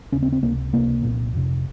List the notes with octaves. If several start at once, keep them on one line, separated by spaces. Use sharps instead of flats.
D#2 C#3 C#4
C4
C4
C#2 C3 A#3
C#2 C3 A#3
C2 A#2
F2 C3